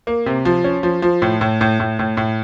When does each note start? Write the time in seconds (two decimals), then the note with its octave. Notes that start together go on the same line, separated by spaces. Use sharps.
0.07 A#3
0.26 C3
0.45 F3
0.64 C#4
0.83 F3
1.02 F3
1.22 A2
1.41 A2
1.61 A2
1.80 A2
1.99 A2
2.17 A2